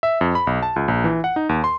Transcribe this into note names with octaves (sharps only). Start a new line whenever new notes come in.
E5
F2
B5
B1
A5
C#2
A#1
E3
F#5
D#4
D#2
C6